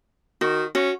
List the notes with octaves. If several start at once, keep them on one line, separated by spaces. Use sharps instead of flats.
D#3 F#4
C#4 F#4